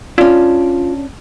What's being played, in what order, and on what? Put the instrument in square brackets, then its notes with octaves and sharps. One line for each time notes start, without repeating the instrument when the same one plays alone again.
[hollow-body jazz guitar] C#4 D4 [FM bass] F4